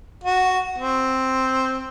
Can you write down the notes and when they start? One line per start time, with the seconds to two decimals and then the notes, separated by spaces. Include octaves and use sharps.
0.24 F#4
0.78 C4